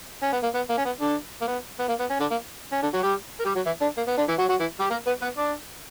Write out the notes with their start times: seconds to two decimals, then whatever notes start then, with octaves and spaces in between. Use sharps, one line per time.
0.22 C#4
0.33 B3
0.43 A#3
0.54 B3
0.69 A#3
0.78 C#4
0.85 B3
1.01 D3 D4
1.41 A#3
1.48 B3
1.79 B3
1.89 A#3
2.00 B3
2.10 C#4
2.20 D3 D4
2.31 A#3
2.72 C#4
2.82 D3 D4
2.93 F#3 F#4
3.03 G3 G4
3.39 A#4
3.45 G3 G4
3.55 F#3 F#4
3.66 E3 E4
3.81 D3 D4
3.97 A#3
4.07 B3
4.17 D3 D4
4.28 E3 E4
4.39 F#3 F#4
4.49 F#3 F#4
4.60 E3 E4
4.80 G3 G4
4.91 A#3 A#4
5.06 B3 B4
5.22 B3 B4
5.38 D4 D5